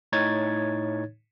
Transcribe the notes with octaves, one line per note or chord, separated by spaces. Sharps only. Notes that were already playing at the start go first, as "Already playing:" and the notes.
A2 D#4 C#5 G#6 A6